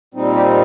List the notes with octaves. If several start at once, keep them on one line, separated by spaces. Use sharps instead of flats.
A#2 G3 C4 D#4
G4